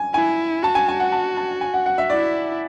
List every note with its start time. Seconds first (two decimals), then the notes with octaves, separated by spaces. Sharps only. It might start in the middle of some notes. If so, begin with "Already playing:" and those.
Already playing: G#5
0.14 E4 G#5
0.63 F#4 A5
0.75 G#5
0.88 G#5
1.00 F#5
1.12 A5
1.37 A5
1.61 G#5
1.74 F#5
1.86 F#5
1.98 E5
2.09 E4 D5